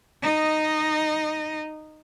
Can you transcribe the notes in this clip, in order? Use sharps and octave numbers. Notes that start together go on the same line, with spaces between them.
D#4 D#5